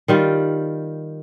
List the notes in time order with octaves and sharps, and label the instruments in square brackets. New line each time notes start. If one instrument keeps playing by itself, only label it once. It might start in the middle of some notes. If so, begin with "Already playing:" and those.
[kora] D#3 G3 F4